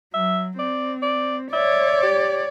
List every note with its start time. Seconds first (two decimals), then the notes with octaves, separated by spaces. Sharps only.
0.14 F#3 E5
0.59 C4 D5
1.02 D5
1.53 C#5 D5 E5
2.03 G4